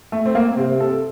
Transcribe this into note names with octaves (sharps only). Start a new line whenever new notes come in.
A3
C4
A#3
C3 C4
A4